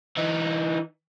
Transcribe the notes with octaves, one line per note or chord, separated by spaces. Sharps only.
E3 D#4